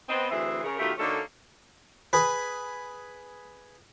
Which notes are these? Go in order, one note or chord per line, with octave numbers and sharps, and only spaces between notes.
B3 C4 D#5
D2 E3 C4 G#4 E5
C#3 A#4
B2 D#3 A3 F4 G4
D3 A#3 C#4 D#4 F#4 A4
G#4 B4